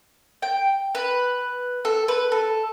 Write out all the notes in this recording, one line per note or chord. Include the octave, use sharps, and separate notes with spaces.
G5
B4
A4
B4
A4